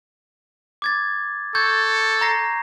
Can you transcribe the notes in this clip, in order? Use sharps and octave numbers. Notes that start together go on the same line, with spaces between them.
D6 G#6 A6
A4 C#6 G6 G#6
A#5 A#6 C7